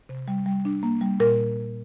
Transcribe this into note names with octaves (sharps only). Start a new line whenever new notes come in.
C3
G3
G3
D4
A#3
G3
A#2 A#4